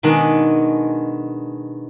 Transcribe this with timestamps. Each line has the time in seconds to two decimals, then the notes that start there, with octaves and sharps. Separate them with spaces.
0.03 B2 D#3 G#3 B3 D4